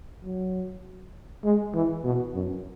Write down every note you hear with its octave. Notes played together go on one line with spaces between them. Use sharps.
F#3
G#3
E3
B2
F#2